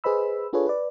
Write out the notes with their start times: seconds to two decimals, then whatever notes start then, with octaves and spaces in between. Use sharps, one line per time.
0.04 G#4 B4 C5 D#5 B5 E6
0.53 D4 F4 G#4 A4 B4 C#5
0.67 B4 D5